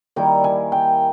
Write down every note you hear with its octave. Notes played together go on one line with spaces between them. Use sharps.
D#3 G3 A#3 E4 G5
G#5
G5